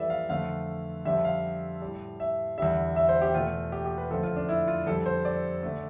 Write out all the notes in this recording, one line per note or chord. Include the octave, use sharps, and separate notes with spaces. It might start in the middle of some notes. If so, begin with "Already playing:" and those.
Already playing: F2 E3 G3 A4 B4 D5 E5
F5
F2 D3 A3 F5
F2 D3 G3 E5
F5
A2 G3
E5
E2 D3 G3 E5
E5
C5
G4
E2 B2 A3 F4
G4
G4
B4
F2 D3 F3 A3 A4
F4
D4
E4
F4
F2 D3 G3 A4
C5
D5
D3 A3